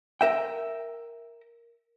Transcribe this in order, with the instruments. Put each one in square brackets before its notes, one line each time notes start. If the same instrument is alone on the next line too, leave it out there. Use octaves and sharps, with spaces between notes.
[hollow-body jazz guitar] A#4 E5 G5